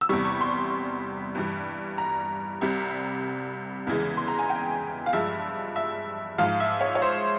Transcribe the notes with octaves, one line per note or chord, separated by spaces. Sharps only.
E6
E2 C3 G3 C#6
C#6
C6
G2 E3 G3
A#5
C2 C3 G3
E2 C#3 E3 G#3
C6
A#5
G#5
G5
F5
G2 F3 G#3 E5
E5
G#2 F3 G#3 F5
E5
C#5
C#5
C5